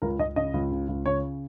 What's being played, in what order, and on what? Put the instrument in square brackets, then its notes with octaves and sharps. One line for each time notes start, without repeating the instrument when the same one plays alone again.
[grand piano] C#2 A#4
C#2 D#5
C#3 D#5
C#2
C#3
C#2
C#3 C#5